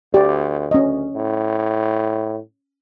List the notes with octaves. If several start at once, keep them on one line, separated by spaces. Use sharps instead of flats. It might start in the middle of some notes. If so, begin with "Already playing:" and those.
D2 G4 D5
D2 C#4 D#5
A2